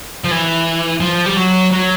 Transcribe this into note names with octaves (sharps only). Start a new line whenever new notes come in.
F3
E3
F3
G3
F#3
F#3